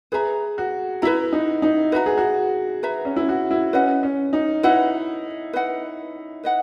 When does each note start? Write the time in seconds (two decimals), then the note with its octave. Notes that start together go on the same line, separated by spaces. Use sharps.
0.12 G#4 B4 E5 A#5
0.58 F#4
1.02 E4 B4 E5 A#5
1.33 D#4
1.62 D#4
1.92 F#4 B4 E5 A#5
2.06 G#4
2.18 F#4
2.83 B4 E5 A#5
3.05 C#4
3.16 E4
3.29 F#4
3.51 E4
3.73 C#4 B4 D#5 F#5
4.03 C#4
4.33 D#4
4.63 E4 B4 D#5 F#5
5.53 B4 D#5 F#5
6.43 B4 D#5 F#5